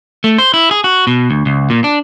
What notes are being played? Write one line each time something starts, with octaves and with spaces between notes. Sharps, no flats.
A3
C5
E4
G#4
F#4
B2
D2
C#2
A#2
D4